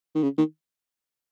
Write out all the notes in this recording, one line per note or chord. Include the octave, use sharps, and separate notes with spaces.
D#3
C#3
D#3